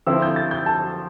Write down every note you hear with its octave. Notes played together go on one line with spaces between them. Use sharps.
D3 F3 C4 E4 E6
G6
A6
G6
A5